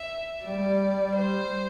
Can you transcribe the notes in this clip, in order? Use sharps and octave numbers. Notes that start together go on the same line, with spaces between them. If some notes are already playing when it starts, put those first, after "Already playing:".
Already playing: E5
G3 D5
C5